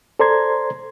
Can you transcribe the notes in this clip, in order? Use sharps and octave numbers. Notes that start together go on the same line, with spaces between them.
A4 C5 D5 A#5 C6 G#6